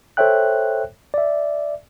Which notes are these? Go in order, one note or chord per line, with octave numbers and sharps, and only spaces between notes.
A4 C5 C#5 E5 G5 F#6
D5 E5